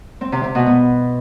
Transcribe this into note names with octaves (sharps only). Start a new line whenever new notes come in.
C4
C3
C3
B2
B3